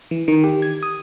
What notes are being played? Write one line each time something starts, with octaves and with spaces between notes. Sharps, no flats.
E3
D#3
G4
G#6
D#6